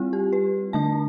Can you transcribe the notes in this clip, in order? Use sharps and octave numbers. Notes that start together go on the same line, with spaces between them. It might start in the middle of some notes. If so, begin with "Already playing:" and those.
Already playing: G3 C4 E4 F4
G4
B4
D3 A3 D4 A5